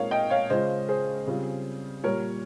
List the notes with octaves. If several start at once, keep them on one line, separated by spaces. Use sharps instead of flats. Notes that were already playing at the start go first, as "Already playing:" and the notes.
Already playing: A#2 G#3 C4 D#4 A#4 C#5 F5
D#5 G5
C#5 F5
C#3 G#3 C#4 F4 C5 D#5
G#4 C5
C#3 G3 C4 F4
A#2 G3 A#3 A#4 C#5